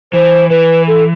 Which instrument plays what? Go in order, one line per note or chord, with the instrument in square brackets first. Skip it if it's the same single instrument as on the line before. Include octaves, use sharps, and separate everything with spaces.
[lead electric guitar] E3 [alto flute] C5
[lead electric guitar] E3 [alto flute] B4
[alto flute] A4